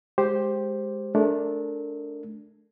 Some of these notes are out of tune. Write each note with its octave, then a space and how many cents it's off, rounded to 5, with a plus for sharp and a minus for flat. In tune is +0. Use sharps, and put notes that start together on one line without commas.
G#3 +0 G4 +0 C5 +5
A3 -25 D4 -10 A#4 -30